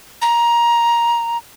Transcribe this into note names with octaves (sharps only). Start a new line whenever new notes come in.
A#5